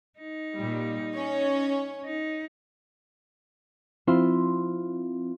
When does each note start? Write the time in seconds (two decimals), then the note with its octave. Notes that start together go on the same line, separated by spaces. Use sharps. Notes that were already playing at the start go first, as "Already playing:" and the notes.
0.19 D#4
0.54 A#2 G3
1.13 C#4 C#5
2.05 D#4
4.07 F3 C4 E4 F4 C6